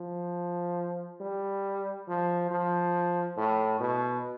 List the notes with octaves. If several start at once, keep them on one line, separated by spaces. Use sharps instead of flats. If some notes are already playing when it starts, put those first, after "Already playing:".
Already playing: F3
G3
F3
F3
A2
B2